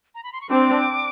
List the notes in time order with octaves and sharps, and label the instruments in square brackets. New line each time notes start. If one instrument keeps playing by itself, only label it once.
[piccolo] A#5
B5
C6
C#6
[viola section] C4 D4 [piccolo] D6